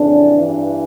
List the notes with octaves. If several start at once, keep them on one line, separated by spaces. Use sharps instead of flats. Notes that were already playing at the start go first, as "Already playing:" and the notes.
Already playing: F2 C#3 E3 D4
G2 E3